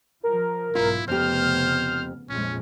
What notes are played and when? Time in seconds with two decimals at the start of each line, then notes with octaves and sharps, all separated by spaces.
0.24 F3 A#4
0.75 B1 G#2 B2 E4 F4
1.08 F1 F2 C#3 B3 G4 C5 F6
2.30 A#1 F2 G#3 C#4